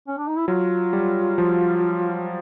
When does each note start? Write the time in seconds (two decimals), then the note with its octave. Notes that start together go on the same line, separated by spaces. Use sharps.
0.08 C#4
0.18 D4
0.28 D#4
0.38 E4
0.48 F#3 F4
0.93 G3
1.38 F3